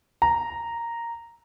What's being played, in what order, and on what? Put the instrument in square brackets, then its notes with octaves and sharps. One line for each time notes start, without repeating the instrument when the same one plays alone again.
[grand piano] A#5